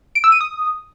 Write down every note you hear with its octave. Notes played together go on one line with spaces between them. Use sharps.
D7
E6
D#7
D#6